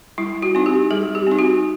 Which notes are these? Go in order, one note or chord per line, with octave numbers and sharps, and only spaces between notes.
G3 E4
F#4
C4 D#4
G4
G3 G#4
G4
C4 D#4
F#4